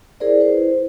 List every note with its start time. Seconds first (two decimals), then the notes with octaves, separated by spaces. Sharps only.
0.20 E4 G#4 A#4 C5 D5
0.40 E4 B4 C5